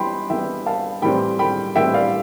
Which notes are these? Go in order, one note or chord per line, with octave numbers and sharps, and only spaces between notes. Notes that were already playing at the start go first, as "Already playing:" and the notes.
Already playing: E3 G3 B3 G5 B5 C6
E3 G3 B3 E5 G5
F5 A5
A2 E3 G3 C4 G5 B5
G5 B5
A2 E3 G3 C4 E5 G5
D5 F5